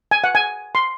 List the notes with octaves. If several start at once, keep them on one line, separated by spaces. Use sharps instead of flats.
G#5
F#5
G#5
C6